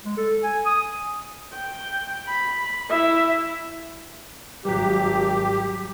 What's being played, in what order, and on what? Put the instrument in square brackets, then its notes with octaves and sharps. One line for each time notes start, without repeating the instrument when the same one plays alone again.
[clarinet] G#3
A4
G#5
D#6
[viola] G5
B5
E4 E5
[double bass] G#1 [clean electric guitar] F#3 G3 [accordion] G4